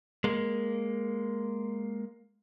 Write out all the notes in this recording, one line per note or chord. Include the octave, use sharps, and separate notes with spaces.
G#3 A#3